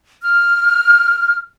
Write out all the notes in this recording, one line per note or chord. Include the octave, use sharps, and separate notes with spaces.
F6